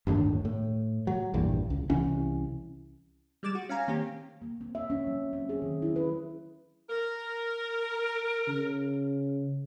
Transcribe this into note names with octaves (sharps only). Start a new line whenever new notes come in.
G1 D#2 A2 D4
A2
F#3
A#1 E2 G2 A#2
C#2
C2 E3 C#4
G3 G#3 D6 A6 E7
F#4
C#4 F5 G#5 A#5
D#3 A#3 C4 C#4 G4
A#3
C4
E5
C#4
F#3
C4
G#4
D#3
E4
B4
A#4
C#3